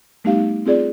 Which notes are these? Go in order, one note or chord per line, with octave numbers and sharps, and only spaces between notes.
G3 A3 B3 D#4 G4 F5
C4 F4 G#4 D5